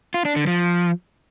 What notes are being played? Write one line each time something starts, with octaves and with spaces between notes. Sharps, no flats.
F4
D4
D3
F3